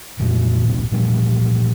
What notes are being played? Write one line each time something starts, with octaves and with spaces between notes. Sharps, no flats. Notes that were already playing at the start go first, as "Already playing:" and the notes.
F2 A#2 E3
D1 A#1 C3
A#2 E3 F3 G3